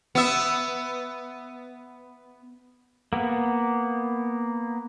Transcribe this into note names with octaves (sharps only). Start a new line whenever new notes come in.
B3 E5
A#3 B3